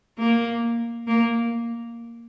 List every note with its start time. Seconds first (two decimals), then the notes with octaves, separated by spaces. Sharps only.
0.19 A#3
1.07 A#3